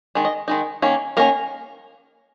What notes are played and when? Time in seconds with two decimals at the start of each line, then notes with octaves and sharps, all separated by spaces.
0.15 D#3 G#3
0.25 D#5
0.48 D#3 G#3 D#4
0.82 D#3 A#3 C#4
1.17 D#3 A#3 C#4 A#4